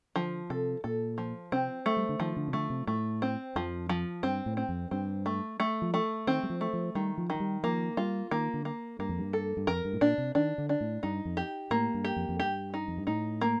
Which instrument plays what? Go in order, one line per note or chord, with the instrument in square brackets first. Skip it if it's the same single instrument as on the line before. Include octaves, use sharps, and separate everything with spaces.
[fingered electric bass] D3 [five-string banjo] F3
[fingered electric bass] C3 [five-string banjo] A4
[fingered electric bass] A#2 [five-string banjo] A4
[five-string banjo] F3
[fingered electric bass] C3 [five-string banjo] C4
[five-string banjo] A3
[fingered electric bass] G3
D3
[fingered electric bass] D#3 [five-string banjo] F3
[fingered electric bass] D3
C3
[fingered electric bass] D3 [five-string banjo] A3
[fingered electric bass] C3
[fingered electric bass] A2 [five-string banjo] A3
[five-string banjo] C4
[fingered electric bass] F2 [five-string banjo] F3
[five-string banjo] F3
[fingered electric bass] G2 [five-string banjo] C4
[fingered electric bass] A2
[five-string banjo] C4
[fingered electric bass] F2
[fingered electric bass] G2 [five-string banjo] C4
[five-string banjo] A3
A3
[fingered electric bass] F3
[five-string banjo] A3
[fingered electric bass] D#3 [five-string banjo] C4
[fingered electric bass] G3
F3
[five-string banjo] A3
[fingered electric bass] F3
[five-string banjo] D#3 [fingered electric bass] G3
[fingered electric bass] F3
[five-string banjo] D#3
[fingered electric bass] F3
G3
[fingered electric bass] F3 [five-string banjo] A#3
[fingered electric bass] G3 [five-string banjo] F4
[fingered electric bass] D#3 [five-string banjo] A#3
[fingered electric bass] D3
[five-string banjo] A#3
[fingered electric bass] G2 [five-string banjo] A#3
[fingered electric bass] F2
G2
[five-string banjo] A4
[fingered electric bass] G2
[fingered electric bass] F2 [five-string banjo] A#4
[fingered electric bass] G2
A2
[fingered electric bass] A#2 [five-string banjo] D4
[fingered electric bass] C3
[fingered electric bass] D#3 [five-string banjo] D4
[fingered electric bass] D3
[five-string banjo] D4
[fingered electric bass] A2
[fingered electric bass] G2 [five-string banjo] D#4
[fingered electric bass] F2
[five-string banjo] G4
[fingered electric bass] A2 [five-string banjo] A#3
[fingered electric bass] G2
[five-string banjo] G4
[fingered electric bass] F2
F2
[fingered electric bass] G2 [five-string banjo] G4
[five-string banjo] D#4
[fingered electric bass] F2
G2
[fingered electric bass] A2 [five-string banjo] D#4
[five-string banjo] A#3